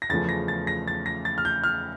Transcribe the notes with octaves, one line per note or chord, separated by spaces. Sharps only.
A#6
E2 C#3 F3 A3 A6
A#6
A6
A#6
A6
A#6
A6
F6
G6
F6